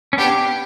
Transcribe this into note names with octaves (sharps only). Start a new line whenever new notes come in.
C#4
B3 D4 G4